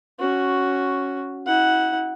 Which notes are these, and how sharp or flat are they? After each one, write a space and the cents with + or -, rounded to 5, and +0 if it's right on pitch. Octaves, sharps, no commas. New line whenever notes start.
C#4 +0 F#4 +0
E4 -35 F#5 +0